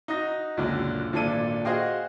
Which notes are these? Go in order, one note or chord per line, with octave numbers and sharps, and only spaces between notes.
D#4 F#4 D#6 A#6
C#2 F#2 A#2 D3 F#3
G#1 A#2 D4 A4 D#7
F#4 G#4 C5 D#5 F5 G5